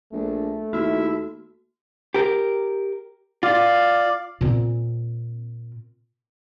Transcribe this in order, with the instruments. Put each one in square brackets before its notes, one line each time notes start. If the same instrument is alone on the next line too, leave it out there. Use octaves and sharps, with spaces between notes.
[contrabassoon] A#1 [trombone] A3
[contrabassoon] D#2 [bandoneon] E4 E5 [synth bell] F#4
[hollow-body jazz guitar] G4 A#4
[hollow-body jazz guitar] F4 [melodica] D5 F5
[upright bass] A#2 C4